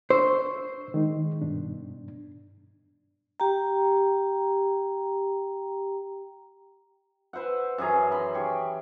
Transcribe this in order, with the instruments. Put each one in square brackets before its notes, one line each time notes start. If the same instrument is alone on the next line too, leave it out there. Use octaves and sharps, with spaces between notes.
[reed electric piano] D4 C#6 E6 [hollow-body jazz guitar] C5
[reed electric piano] D#3 G#3 D#4
G2 B2 D4
[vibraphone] G4 G5 A#5
[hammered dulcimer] B4 C5 E5 F#5
F#2 E3 G#4 A#5
B5 C6
G4 C#6